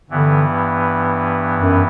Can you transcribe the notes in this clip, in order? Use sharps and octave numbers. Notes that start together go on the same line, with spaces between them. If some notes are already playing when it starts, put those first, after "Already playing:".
G2 D3 E3 B3
F#2